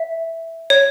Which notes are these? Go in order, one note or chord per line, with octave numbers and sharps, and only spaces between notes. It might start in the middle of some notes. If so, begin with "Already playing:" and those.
Already playing: E5
C#5